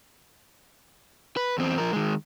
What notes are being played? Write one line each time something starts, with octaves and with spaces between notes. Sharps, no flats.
B4
E2 C4
F3 A#4
D#3 G#3